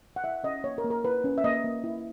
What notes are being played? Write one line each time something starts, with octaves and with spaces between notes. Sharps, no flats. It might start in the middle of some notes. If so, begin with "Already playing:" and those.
F#5
E4 E5
C#4 D#5
A#3 C#5
A#4
A#3
A#4
E4 B4
C#4
E5
A#3 D#5
A#3
E4